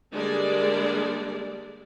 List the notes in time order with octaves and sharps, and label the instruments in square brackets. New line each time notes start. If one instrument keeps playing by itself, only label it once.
[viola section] D3 G3 G#3 A#3 D4 D5